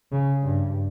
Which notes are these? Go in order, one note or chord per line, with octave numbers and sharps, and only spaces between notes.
C#3
G2